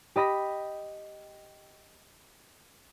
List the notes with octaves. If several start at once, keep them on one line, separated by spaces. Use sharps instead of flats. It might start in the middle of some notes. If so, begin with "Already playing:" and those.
G4 D#5 B5 A#6